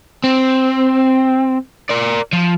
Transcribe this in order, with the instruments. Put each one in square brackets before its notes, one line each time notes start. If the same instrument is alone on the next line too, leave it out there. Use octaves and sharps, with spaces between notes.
[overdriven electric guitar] C4
A#4 D5
F3